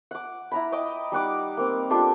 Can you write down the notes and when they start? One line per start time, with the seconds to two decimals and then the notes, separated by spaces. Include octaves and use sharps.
0.11 F#5 D6
0.51 E4 A#5 B5
0.72 D#5 G5 D6 D#6
1.12 G3 D#4 F#5 D6
1.57 A#3 C4
1.90 D4 F4 G4 A4